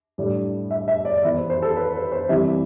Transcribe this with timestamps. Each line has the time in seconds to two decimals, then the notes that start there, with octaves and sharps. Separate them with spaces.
0.18 A2 G3 D4
0.71 E5
0.88 E5
1.05 D5
1.23 E3 B3 E4 E5
1.37 C5
1.50 C5
1.62 A4
1.76 B4
1.93 B4
2.12 C5
2.29 C3 E3 G3 E5